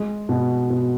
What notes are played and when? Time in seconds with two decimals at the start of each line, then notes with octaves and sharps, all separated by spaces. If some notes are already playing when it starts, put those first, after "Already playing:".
Already playing: G#3
0.29 B2
0.70 B2